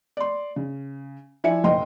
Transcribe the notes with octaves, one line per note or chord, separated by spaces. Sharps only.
D5 C6
C#3
F3 E4 D5 E5 G#5 C#7
F#1 B1 D#5 G5 C6